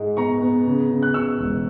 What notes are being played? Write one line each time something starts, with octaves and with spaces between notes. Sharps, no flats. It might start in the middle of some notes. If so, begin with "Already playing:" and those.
Already playing: G#2 G#3
B3 A#5 C#6
B3
C#3
C#3
F#6
C#3 C#6 E6
E1